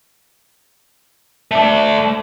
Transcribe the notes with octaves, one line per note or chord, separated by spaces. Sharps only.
A3 D5